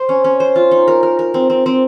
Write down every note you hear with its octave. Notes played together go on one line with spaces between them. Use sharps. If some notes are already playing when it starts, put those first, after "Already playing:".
Already playing: C5
C#4
C#4
C5
F4
D#4
A#4
A#4
A#4
C4
C4
C4